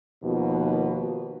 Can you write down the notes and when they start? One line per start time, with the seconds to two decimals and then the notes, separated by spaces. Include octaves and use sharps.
0.23 D#2 B2 F3